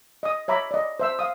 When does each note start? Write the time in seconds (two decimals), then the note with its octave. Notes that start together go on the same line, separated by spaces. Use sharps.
0.23 D#5 D#6
0.48 C#5 E5 A#5 B5 D6
0.71 D5 D#5
1.00 C5 E5 E6
1.19 F5 D#6